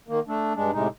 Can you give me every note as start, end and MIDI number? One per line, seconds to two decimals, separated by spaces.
0.08 0.20 51
0.08 0.20 58
0.28 0.53 57
0.28 0.53 62
0.56 0.71 43
0.56 0.71 56
0.56 0.71 62
0.73 0.88 45
0.73 0.88 48
0.73 0.88 56
0.73 0.88 63